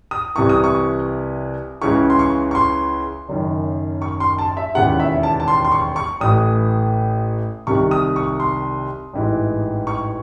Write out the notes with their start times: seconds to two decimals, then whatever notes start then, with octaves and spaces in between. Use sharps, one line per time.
0.11 D#6
0.36 C2 C3 E3 C#6
0.49 D#6
0.64 C#6
1.82 C#2 C#3 E3 C#6
2.10 C6
2.19 C#6
2.51 C#6
2.55 C6
3.29 F#1 F#2 D#3
4.02 C#6
4.20 C6
4.39 A5
4.57 E5
4.74 E1 D#2 C#3 E3 F#5
5.00 E5
5.23 A5
5.40 A5
5.48 C6
5.65 C6
5.72 C#6
5.96 C#6
6.20 A1 A2 E3 D#6
7.67 C2 C3 D#3 C#6
7.91 D#6
8.16 C#6
8.40 C6
9.13 A1 G#2 E3
9.87 C#6